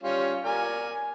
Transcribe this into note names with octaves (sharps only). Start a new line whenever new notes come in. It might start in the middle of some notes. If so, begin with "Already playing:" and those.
G3 C#4 F4
A#4 D5 G#5